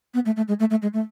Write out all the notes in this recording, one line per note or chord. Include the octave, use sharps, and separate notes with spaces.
B3
A3
A3
G#3
A3
A3
G#3
A3